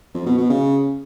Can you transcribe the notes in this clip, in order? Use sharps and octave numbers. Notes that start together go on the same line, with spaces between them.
F2
B2
B2
C#3